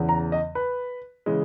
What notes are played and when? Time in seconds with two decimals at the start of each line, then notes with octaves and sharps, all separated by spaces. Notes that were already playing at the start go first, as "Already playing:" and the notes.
Already playing: E2 C#3 E3
0.09 A#5
0.32 D#5
0.55 B4
1.26 C#3 E3 G#3